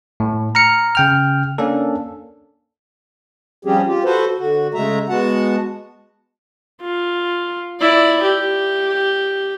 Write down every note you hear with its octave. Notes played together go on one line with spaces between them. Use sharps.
A2
A#5 F6 C#7
C#3 G5 F6
A#3 C#4 D4 A4
F3 G3 C4 C#4 G4 G#4
F4 G4
F#4 A4 B4 C5
D3 F#4
C#3 G#3 A3 E5 A#5
G#3 B3 F#4 F#5 A5
F4
E4 D5
G4